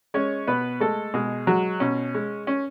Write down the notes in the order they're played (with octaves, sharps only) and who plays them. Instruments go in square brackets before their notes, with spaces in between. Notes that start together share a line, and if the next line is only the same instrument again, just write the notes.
[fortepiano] G#3 C#4 C#5
B2 B3 B4
G#3 A3 A4
B2 G#3 G#4
F#3 G#3 F#4
B2 C#4
G#3
C#4